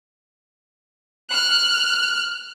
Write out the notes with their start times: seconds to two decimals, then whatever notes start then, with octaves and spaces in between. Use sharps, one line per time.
1.31 F6 F#6